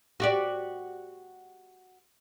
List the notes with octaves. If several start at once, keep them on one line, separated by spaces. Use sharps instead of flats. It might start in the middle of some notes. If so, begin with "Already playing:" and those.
F#4 G4 D5